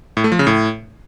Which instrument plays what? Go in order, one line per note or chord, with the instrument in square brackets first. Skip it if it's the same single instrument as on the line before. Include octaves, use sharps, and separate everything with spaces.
[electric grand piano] A2
A3
F3
C#3
A2